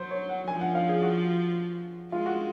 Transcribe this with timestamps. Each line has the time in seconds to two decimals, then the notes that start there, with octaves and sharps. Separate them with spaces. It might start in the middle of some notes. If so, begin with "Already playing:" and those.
Already playing: F#3 C5
0.11 C#5
0.29 F#5
0.48 F3 G#5
0.61 F#5
0.75 F5
0.89 G#4
1.02 F#4
2.12 G#3 F4
2.26 F#4